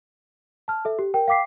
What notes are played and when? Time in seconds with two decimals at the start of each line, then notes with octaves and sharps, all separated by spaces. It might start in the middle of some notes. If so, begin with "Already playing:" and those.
0.68 A5 F6
0.85 A4 E5
0.99 G4
1.14 A#4 G5
1.28 F5 G5 D6 B6 C7